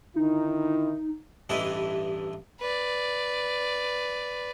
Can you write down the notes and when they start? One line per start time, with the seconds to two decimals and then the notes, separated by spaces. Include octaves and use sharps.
0.16 D3 D#3 D#4 E4
1.49 A1 G2 E3 E4 D#5
2.60 B4 D5